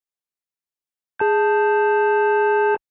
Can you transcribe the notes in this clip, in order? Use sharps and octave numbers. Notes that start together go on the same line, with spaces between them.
G#4 A5 G6